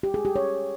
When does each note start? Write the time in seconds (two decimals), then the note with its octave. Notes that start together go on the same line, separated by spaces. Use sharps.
0.03 G4
0.14 G#4
0.25 G4
0.36 C#5